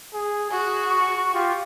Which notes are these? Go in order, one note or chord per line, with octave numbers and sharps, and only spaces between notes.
G#4
F#4 G#4
C#6
F4 G4